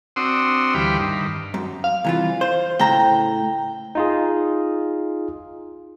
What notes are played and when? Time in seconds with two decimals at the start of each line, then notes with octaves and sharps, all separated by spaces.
0.16 C4 D4 F#4 C6 D#6 E6
0.74 D2 E3 G3 G4 F5 B5
0.99 G2 D#3
1.54 F#2
1.84 F5
2.04 C2 E3 F4
2.41 C5
2.79 A2 C#3 G5 A#5
3.95 D#4 F4 G#4